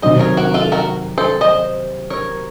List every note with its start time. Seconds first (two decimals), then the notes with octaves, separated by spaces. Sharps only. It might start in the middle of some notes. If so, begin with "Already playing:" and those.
0.02 C3 D#3 F#3 C5 D#5
0.19 A#4 C#5
0.37 F#4 A#4
0.54 F4 A4
0.72 F#4 A#4
1.18 A4 C5
1.41 C5 D#5
2.10 A#4 C#5